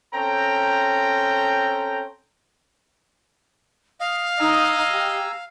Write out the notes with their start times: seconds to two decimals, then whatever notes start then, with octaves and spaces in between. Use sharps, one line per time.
0.13 C4 C#4 A4 G5 A#5
4.00 D#5 F5
4.40 D#4 D#5 G#5 A#5 D#6 E6
4.89 G4